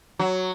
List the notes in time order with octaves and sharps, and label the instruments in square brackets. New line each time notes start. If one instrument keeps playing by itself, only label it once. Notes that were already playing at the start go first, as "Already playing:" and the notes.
[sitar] F#3